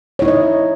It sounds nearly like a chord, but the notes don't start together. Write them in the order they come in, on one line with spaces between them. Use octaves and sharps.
C#5 E4 D#4 D#5